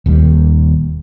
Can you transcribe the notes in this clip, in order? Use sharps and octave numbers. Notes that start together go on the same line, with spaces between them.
D#1 D#2 G3